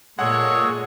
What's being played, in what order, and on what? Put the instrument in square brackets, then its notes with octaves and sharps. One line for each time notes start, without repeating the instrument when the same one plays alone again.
[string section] A#2 [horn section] G#3 C#5 [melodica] G#4 A4 [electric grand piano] F#5